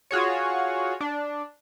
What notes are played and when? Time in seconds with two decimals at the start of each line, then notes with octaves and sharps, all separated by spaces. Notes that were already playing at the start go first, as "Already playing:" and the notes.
0.11 F4 F#4 G#4 C#5
1.01 D4